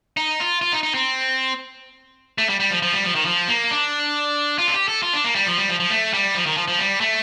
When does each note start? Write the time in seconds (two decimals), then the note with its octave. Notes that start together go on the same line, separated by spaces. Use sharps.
0.17 D#4
0.40 F4
0.61 F4
0.73 D#4
0.83 D#4
0.94 C4
2.38 A3
2.49 G3
2.60 G3
2.71 F3
2.82 F3
2.93 G3
3.04 F3
3.15 D#3
3.26 F3
3.48 A#3
3.71 D4
4.58 F4
4.67 A4
4.74 G4
4.88 A4
5.03 F4
5.14 D4
5.24 A#3
5.35 G3
5.46 F3
5.58 G3
5.69 F3
5.80 F3
5.90 A3
6.13 G3
6.34 F3
6.46 D#3
6.57 F3
6.68 F3
6.79 G3
7.00 A3